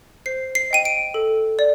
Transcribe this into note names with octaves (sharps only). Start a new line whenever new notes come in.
C5 C7
C7
D#5 G5 D#7
D7
A4
D5